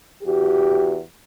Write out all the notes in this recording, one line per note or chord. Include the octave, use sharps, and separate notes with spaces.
E2 F#4 G4